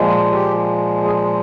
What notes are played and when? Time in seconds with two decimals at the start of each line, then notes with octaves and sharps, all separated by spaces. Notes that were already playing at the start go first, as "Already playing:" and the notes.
Already playing: A#2 F3 G#3
0.31 G4
1.04 G#4